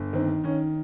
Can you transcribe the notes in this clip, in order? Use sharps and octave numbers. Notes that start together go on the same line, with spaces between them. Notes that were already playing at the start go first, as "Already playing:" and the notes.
Already playing: G1
D#3 C4
D#3 C#4